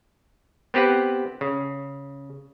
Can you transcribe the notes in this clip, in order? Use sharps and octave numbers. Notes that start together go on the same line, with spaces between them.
B3 C4 G4 B4 F#5
C#3